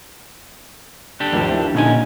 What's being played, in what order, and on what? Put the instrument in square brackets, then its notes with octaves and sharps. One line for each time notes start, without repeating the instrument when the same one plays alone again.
[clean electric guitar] D4 G4 A4
[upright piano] G#1 D#2 F3
E4
[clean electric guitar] A#2 C#4 G#5 [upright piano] D3 D#4